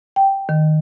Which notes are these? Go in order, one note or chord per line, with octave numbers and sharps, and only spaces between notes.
G5
D#3